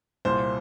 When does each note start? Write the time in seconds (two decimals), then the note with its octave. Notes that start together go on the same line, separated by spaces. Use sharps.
0.25 C2 A#2 C5